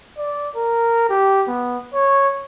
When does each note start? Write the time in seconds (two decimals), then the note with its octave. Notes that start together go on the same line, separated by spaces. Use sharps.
0.18 D5
0.56 A#4
1.10 G4
1.48 B3
1.94 C#5